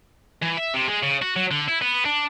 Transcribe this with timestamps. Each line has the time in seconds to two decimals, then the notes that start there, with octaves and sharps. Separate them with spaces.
0.42 E3
0.57 E5
0.74 C3
0.88 G#3
1.03 C#3
1.22 F#4
1.36 F#3
1.51 D3
1.68 E4
1.82 B3
2.05 D4